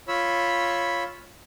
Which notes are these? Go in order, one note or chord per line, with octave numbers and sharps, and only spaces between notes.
F4 C#5 B5 E6